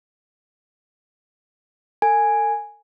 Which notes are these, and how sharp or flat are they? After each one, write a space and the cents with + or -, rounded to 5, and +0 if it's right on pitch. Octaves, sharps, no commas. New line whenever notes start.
A4 +45 G#5 +0